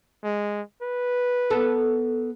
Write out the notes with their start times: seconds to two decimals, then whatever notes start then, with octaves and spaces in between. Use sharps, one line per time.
0.24 G#3
0.82 B4
1.50 B3 A4